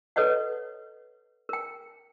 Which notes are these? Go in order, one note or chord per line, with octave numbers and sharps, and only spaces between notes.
A4 B4 C#5 D#5 F#5
A#4 G5